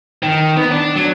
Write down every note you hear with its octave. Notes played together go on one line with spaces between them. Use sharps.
D#3
B3
D4
F#3